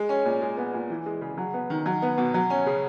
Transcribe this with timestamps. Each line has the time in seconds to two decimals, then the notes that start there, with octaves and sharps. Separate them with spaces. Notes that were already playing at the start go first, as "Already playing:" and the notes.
Already playing: G#3
0.09 C#4
0.25 A#2
0.42 G#3
0.57 B3
0.74 A#2
0.90 E3
1.06 G#3
1.21 C#3
1.37 F#3
1.54 B3
1.70 D#3
1.86 F#3
2.02 B3
2.18 B2
2.34 F#3
2.50 C#4
2.66 C#3